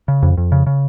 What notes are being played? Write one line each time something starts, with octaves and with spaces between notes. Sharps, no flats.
C#3
F2
F2
C#3
C#3